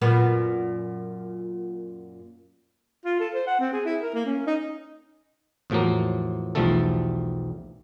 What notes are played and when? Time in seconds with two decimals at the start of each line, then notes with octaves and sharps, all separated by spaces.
0.02 F#2 A#2 B3
3.05 F4
3.20 A4
3.34 C5
3.47 F#5
3.59 C4
3.73 G#4
3.85 E4
4.02 A#4
4.14 A#3
4.26 C#4
4.47 D#4
5.70 E2 A2 F3 F#3 A#3
6.55 B1 E2 F3 G3 A3 A4